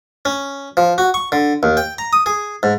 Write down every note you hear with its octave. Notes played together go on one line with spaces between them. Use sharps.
C#4
F3
F#4
C#6
D3
D#2
G5
A#5
D#6
G#4
G#2